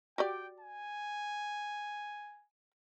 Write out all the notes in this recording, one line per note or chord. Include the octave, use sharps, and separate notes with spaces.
F#4 G4 D5 G5
G#5